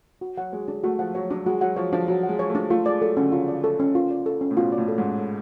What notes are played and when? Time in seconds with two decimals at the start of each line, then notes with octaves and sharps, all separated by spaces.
0.21 F#4
0.37 F#3 F#5
0.53 G#3 C#5
0.68 G#3 D4
0.84 A3 F#4
0.99 F3 F#5
1.15 F#3 C#5
1.30 F#3 D4
1.46 G#3 F#4
1.61 F#3 F#5
1.76 F3 C#5
1.93 F3 D4
2.08 F#3 F#4
2.23 F#5
2.29 G#3
2.39 C#5
2.49 A3
2.55 D4
2.70 A3 F4
2.86 G#3 D5
3.01 F#3 A4
3.17 D3 C#4
3.32 C#3 F4
3.48 D5
3.64 A4
3.80 C#4
3.95 F4
4.10 D5
4.26 A4
4.41 C#4
4.51 A2
4.57 B2 F4
4.72 D5
4.78 A2
4.88 A4
4.98 G#2
5.03 C#4
5.19 A4